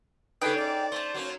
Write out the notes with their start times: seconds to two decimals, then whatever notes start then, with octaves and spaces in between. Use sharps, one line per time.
0.42 C#3 G3 D4 D#4 G#4 A4 B4 G5
0.57 G#2 D5
0.92 A3 C5 A5
1.14 F#3 A#3 C#4